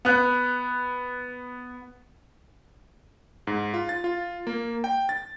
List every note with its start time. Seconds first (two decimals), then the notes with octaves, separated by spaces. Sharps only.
0.05 B3 F#6
3.47 G#2
3.74 F4
3.89 A6
4.04 F4
4.47 A#3
4.84 G5
5.09 A6